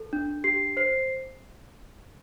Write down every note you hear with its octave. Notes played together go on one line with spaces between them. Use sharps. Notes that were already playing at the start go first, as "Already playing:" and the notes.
Already playing: A4
D4
G4 C7
C5 C7